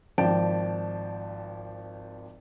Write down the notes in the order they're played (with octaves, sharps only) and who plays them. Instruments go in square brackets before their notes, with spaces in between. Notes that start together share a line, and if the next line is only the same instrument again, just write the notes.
[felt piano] G#1 F3 D5 G5 A5 D7